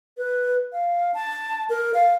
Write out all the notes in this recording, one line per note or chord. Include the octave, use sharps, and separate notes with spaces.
B4
F5
A5
A#4
F5